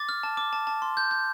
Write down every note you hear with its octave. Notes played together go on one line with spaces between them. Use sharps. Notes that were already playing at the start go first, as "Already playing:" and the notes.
Already playing: D6 A6
F6
A5
D6
A5
A5
C6
G6
G6